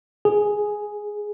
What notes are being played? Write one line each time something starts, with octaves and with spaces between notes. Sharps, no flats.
G#4